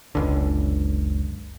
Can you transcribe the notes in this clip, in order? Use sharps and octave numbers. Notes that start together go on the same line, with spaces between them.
F#1 C#2 D3